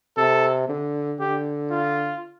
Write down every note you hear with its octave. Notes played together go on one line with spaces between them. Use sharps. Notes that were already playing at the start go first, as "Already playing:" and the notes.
C3 A4
D3
D3 G4
F4